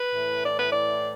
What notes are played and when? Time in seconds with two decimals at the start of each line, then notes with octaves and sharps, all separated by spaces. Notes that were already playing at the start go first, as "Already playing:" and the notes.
Already playing: B4
0.12 A2 E3
0.44 D5
0.59 B4
0.72 D5